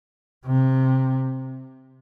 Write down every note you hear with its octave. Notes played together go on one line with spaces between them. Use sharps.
C3